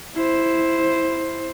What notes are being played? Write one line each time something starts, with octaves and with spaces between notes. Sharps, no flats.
E4 C5